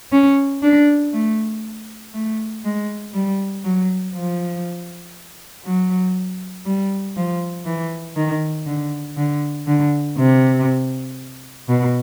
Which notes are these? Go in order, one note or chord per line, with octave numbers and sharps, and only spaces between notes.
C#4
D4
A3
A3
G#3
G3
F#3
F3
F#3
G3
F3
E3
D#3
D3
D3
D3
C3
B2